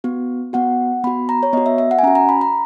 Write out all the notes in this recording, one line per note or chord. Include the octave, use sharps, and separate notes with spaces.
B3 F#4
B3 F#4 F#5
B3 F#4 B5
A#5
C#5
B3 F#4 D#5
E5
E5
F#5
G#5
C#4 F#4 A#5
A#5
B5
A#5